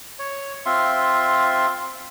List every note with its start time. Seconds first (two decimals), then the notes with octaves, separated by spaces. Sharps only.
0.19 C#5
0.66 C4 F4 E5 C6